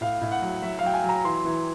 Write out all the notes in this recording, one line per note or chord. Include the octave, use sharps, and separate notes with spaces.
A2 F5
A2
F#5
F#3
F#3 E5
F5
F#3 G5
G#5
F#3
A#5
E3 C6
E3